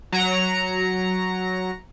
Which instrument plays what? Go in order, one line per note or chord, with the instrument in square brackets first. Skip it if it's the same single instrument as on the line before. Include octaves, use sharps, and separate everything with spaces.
[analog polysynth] F#3 A#5 C#7